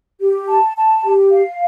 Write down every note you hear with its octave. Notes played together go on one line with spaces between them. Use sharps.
G4
A5
A5
G4
F5